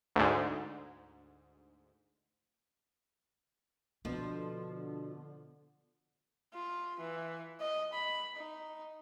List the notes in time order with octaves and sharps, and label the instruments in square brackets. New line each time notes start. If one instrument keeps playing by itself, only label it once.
[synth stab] D2 G#2
[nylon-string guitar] B2 [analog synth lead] D3 [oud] F3 [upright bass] B3
[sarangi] F4
E3
D#5
B5
D#4